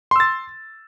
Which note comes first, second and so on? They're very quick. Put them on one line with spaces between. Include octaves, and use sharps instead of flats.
C6 E6 A6